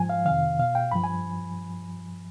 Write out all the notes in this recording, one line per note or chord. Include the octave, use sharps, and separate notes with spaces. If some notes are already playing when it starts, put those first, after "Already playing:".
Already playing: G#2 F3 G#5
F5
F2 C3 D#3 F5
B2 F5
G5
G2 F3 B5
G#5